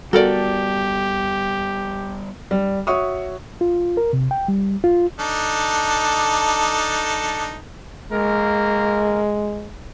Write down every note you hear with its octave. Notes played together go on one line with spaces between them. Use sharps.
G3 B3 F#4 G4 A4 A#4 D5
G3
F#4 C#5 E5 C#6 D#6
F4
A#4
C3
G5
G3
F4
D4 D#4 A4
C#2 G#3 A#3 A#4